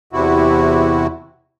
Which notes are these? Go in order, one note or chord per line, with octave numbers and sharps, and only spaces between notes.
E2 C3 E4 F#4